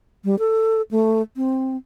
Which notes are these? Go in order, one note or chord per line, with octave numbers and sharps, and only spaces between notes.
G3
A4
A3
C4